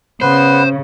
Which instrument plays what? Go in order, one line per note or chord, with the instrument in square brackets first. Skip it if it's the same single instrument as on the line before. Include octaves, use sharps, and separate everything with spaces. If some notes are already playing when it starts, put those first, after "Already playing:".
[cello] C#3 [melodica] B3 B4 [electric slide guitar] C5